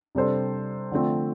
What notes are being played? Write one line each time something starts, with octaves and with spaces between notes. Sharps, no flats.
C3 G3 D4 A4 C5
D3 F3 A3 C4